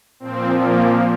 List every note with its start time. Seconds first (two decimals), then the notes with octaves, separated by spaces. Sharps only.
0.20 A#2 F3 C4
0.56 A#3